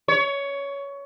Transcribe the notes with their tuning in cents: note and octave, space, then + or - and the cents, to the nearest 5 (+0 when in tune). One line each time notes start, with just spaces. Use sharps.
C#5 +15